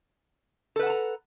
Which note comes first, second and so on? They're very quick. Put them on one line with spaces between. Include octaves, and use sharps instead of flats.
A4 B4 F#5 A5 A#5